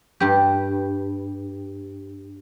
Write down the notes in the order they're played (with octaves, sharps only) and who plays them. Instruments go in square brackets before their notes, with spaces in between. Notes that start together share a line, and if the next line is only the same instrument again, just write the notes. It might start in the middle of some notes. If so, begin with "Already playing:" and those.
[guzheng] G2 G4